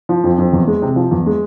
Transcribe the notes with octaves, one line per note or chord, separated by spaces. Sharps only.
F3
F2
F2
E2
G#3
C3
F3
E2
G#3